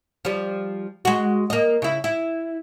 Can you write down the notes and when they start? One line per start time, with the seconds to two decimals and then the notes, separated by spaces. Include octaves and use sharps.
0.25 F3 G3
1.05 G#3 F#4
1.50 A#3 D#5
1.82 C#3 E4
2.04 E4